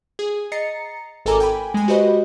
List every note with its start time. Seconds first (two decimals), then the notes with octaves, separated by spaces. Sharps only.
0.19 G#4
0.52 D#5 A#5 A6 C7 C#7
1.25 G#1 A4 A#4 G#5 A#5 D6
1.40 G5 G#5 B5
1.74 G#3 G#5
1.88 F#4 G4 B4 C5 D#5 B5